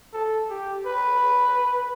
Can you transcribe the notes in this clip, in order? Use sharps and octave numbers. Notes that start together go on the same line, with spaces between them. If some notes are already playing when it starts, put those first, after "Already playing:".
A4
G4
B4